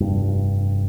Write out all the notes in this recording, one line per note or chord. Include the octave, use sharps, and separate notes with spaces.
F1 G2